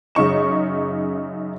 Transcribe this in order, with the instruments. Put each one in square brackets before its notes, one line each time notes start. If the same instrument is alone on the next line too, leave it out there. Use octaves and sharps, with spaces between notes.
[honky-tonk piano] F#2 C#3 D#4 C#6 E7